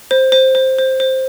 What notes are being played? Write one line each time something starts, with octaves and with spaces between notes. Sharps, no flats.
C5
C5
C5
C5
C5